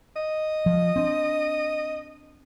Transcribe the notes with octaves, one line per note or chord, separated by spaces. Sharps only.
D#5
F3
C4 D4